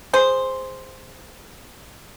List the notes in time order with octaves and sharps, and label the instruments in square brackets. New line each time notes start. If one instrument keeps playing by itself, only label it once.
[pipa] G#4 C5